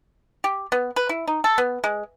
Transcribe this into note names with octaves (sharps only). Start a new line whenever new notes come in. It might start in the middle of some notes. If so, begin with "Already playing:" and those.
G4
B3
B4
E4
D#4
A4
B3
G#3